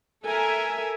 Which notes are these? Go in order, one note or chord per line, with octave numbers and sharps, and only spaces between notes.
A4 A#4 E5 G#5